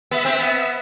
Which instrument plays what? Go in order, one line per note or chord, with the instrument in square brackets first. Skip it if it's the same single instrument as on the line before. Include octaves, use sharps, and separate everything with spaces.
[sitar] B3 [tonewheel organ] E5
[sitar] C4
B3